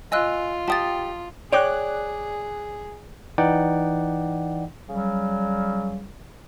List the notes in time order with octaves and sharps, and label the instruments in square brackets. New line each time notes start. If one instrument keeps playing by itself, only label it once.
[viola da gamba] F4 [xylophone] D#5 E6 F#6 [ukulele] G#5
[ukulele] G4 G5 [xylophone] A5 D#6 A6
[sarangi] G#4 [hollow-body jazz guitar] C#5 G5 [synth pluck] D5 D6 F#6
[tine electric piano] E3 D#4 D5 F#5 G5
[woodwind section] C#3 F#3 G3